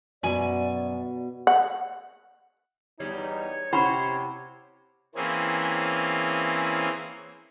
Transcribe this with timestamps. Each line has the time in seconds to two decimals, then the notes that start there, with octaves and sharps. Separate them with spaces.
0.23 F#2 B2 D5 G#5
1.47 F#5
3.00 E2 G3 D#4 C#5
3.73 C3 C#4 E4 C5 F#5 B5
5.15 E3 A#3 C4 C#4 G#4